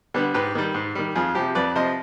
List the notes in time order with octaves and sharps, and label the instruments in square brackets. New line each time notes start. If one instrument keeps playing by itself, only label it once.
[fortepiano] D3 G3 B3
G#2 G4 B4
D#3 G3
G#2
D#3 G3
F2 F4 G#4
C3 F3 G4
F2 B4 D5
C3 F3 C5 D#5